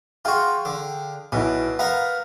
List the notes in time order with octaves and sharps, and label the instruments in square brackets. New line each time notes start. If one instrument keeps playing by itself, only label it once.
[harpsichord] F4 F#4 [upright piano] G#4 F5 G5
[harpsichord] D3
[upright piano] B1 E4 [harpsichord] B2
[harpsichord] B3 A#4 [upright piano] F5